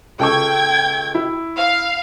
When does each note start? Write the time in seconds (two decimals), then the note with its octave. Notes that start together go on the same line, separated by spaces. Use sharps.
0.19 C#2 A4 G5 C#6 G#6
1.15 E4
1.57 F5